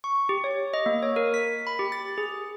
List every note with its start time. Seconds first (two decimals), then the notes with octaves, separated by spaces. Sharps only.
0.04 C#6
0.29 G4
0.44 C#5
0.74 D#5
0.86 A#3
1.03 C#5
1.16 A#4
1.34 B6
1.67 B5
1.79 G4
1.92 A6
2.18 G#4